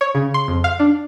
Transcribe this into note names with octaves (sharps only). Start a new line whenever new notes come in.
C#5
C#3
C6
F2
F5
D4